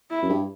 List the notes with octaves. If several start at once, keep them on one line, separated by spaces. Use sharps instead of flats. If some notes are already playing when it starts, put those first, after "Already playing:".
E4
F#2
G2